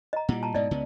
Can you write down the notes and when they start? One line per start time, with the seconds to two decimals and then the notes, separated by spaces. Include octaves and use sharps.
0.13 D#5 A#5
0.29 A#2 G3 E4 F#5
0.43 A5 A#5
0.54 G#2 B2 D5 D#5
0.71 C#2 C#3 B3